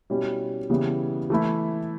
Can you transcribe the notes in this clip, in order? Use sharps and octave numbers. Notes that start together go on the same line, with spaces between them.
B2 G3 C#4 E4
C#3 E3 G3 B3
E3 A3 E4